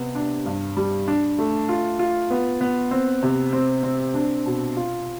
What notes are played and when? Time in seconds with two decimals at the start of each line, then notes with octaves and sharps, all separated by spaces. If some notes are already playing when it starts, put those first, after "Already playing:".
Already playing: C3 B3
0.15 D4
0.46 G2
0.77 G3
1.08 D4
1.38 A3
1.69 F4
1.99 F4
2.30 B3
2.61 B3
2.91 C4
3.23 C3
3.53 C4
3.83 C4
4.14 D4
4.46 B2
4.77 F4